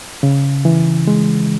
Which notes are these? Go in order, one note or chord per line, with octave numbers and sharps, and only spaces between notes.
C#3
E3
G#3